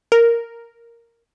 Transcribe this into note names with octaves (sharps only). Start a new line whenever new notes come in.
A#4